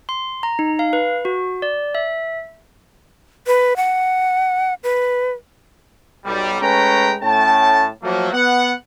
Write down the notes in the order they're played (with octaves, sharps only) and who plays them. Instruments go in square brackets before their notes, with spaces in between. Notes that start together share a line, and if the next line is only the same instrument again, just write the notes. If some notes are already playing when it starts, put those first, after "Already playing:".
[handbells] C6
A#5
D#4
F5
B4
F#4
D5
E5
[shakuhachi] B4
F#5
B4
[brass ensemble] B1 G3
G#3 A3 C#4 B4 G5 A#5
A2 A3 C#4 G5 A5
F3 F#3 A3 A#3
B3 F#5